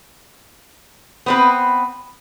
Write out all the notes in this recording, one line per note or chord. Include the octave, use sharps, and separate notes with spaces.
B3 C4 B4